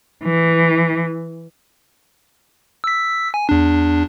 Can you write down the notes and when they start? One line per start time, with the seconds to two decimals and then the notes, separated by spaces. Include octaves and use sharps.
0.23 E3
2.84 E6 B6
3.34 G#5
3.49 E2 D4